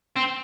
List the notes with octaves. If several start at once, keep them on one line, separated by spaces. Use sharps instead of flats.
C4